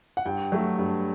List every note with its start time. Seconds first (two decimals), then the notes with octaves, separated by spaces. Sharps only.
0.17 F#5
0.26 G2 G5
0.52 F#3 A3
0.79 G2